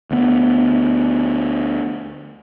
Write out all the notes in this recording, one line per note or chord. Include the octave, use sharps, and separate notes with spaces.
D2 B3